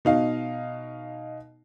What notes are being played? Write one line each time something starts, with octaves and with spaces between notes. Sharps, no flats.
B2 D#4 F5